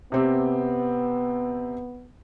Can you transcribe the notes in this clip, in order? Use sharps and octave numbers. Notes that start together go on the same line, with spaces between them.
C3 B3 C4 G4